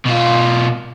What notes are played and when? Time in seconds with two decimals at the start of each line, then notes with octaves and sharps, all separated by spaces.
0.06 B2 F4